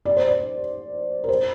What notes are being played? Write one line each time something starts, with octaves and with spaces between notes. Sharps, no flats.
D5
C5
D5
A#4
C5